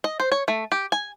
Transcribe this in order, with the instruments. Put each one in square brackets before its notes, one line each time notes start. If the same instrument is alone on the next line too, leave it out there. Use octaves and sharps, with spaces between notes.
[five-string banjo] D#5
C5
C#5
A3
G4
G#5